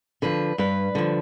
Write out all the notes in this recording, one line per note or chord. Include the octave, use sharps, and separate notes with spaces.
D3 F3 B4
G2 B4
D3 F3